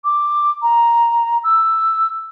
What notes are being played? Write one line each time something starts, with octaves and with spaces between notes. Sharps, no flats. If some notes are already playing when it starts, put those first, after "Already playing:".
D6
A#5
E6